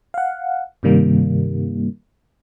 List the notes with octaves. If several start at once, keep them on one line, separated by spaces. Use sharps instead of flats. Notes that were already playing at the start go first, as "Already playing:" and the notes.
F5 F#5
G2 C3 D#3 G3 A#3